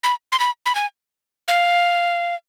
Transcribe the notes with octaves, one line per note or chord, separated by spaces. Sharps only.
B5
C6
B5
B5
G#5
F5